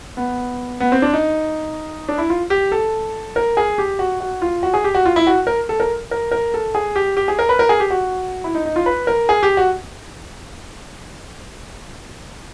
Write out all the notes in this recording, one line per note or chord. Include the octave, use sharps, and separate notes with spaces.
B3
B3
C4
D4
D#4
D4
E4
F4
G4
A4
A#4
G#4
G4
F#4
F#4
F4
F#4
G#4
G4
F#4
F4
E4
F#4
A#4
A4
A#4
A#4
A#4
A4
G#4
G4
G4
G#4
A#4
B4
A#4
G#4
G4
F#4
E4
D#4
D#4
F4
B4
A#4
G#4
G4
F#4